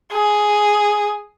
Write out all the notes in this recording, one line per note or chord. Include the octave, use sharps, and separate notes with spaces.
G#4